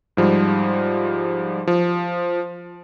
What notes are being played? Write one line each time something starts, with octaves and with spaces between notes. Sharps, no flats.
G#2 F3 G3
F3